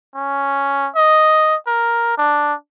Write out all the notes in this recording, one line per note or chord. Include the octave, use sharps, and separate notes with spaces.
C#4
D#5
A#4
D4